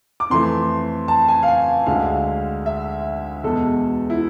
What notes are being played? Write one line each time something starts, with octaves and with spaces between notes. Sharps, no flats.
D6
F2 E3 A3 C6
A5
G#5
F5
G#5
D2 D3 G#3 F5
E5
E2 B2 G#3 A4
E4